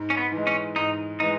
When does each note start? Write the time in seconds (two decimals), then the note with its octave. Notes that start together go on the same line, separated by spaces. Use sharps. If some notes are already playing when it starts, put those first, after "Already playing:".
Already playing: G#2
0.10 C#4
0.17 B3
0.32 E3
0.37 G#3
0.47 C#4
0.76 G#2 D#4
1.20 E3 G#3 D#4